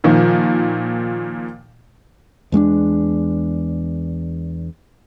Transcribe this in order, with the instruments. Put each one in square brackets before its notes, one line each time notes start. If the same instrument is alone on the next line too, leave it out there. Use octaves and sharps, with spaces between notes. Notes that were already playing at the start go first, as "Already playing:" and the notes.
[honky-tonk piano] A#2 D#3 F3
[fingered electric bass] E2 G#3 C#4 D4